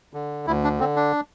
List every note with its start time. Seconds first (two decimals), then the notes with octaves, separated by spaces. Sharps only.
0.13 D3
0.47 D2 E4
0.64 D4
0.79 D3 C4
0.96 D4